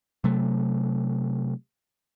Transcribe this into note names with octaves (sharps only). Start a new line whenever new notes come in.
C3 F#3 A3